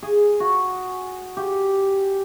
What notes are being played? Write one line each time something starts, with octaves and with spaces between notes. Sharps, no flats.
G#4
F#4
G4